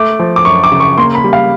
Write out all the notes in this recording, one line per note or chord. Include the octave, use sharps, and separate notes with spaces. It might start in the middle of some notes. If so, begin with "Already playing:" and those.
Already playing: A3 D6
F3
D6
F#2 C#6
D6
C#3
C#6
A#3 C6
B5
G3
F5